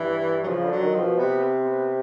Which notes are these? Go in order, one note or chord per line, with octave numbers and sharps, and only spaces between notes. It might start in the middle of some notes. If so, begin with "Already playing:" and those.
Already playing: G2 E3
F#3
C#3 F3
D3
F#3
D#3
F3
B2
C3 B3
C4
B3